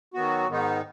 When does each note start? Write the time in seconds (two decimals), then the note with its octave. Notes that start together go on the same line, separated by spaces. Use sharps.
0.14 D#3 F#3 B3 F#4
0.47 G#2 D#3 B3 D#4